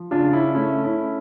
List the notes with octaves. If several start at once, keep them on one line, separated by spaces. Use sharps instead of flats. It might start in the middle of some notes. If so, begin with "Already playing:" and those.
Already playing: F3
C#3 D4 F4
C#4 E4
A3 C#4 E4
C#4 E4